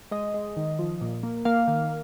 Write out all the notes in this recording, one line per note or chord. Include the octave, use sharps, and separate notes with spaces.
G#3 D#5
G#3
D#3
F3
A#2
A#3
A#3 F5
D#3